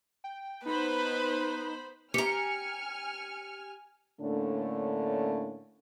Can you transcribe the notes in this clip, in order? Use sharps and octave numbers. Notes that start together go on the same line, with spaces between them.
G5
B3 D#4 B4 C5 B5
G4 G#5 A#5 F6 C#7
A2 D3 A3 A#3 C#4 D4